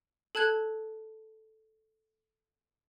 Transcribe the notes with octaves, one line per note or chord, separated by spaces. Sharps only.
A4 A5 F#6 G#6